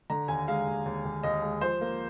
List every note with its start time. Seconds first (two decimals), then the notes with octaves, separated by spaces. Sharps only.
0.10 D3 A#5
0.28 D#2 G#5
0.48 G#3 F5
0.67 D#2
0.86 D#2
1.05 D#2
1.23 D#2 D#5
1.43 G#3
1.61 F3 C5
1.81 A#3